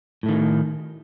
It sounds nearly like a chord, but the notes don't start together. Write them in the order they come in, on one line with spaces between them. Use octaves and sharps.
A2 A3 D#3